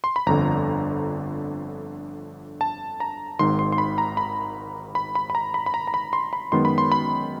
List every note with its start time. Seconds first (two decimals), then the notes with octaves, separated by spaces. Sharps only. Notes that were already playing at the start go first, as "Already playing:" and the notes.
0.04 C6
0.16 B5
0.26 G1 F2 D3 A#5
2.61 A5
3.00 A#5
3.39 G#1 G#2 D#3 C6
3.59 C6
3.72 C6
3.78 B5
3.98 A#5
4.17 B5
4.95 B5
5.15 B5
5.30 B5
5.35 A#5
5.54 B5
5.66 B5
5.74 A#5
5.87 A#5
5.94 B5
6.13 C6
6.33 B5
6.52 F#2 D#3 G#3 B3 C6
6.65 B5
6.78 C6
6.92 B5